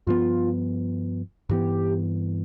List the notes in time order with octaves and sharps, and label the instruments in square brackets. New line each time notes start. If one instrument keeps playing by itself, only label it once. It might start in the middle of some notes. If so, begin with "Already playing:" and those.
[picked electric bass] G2 F3 B3 [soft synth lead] F4
[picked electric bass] G2 E3 B3 [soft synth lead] G4